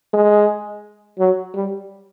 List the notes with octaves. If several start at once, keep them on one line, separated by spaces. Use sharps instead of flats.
G#3
F#3
G3